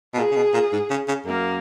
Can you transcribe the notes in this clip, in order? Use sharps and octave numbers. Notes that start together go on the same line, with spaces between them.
B2
A#2 G#4
C#3
B2
A#2
G#2
C#3
C#3
F#2 A#3